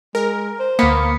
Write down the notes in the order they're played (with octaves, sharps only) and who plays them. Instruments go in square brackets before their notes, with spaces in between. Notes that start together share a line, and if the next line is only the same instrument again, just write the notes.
[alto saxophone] G#3 [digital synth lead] A#4
[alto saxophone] C5
[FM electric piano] D2 B6 C#7 [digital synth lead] A#3 [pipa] B3